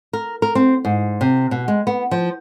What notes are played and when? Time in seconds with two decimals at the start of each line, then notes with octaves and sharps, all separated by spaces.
0.13 A#4
0.42 A#4
0.55 C4
0.85 G#2
1.21 C3
1.51 B2
1.68 G#3
1.87 B3
2.11 F3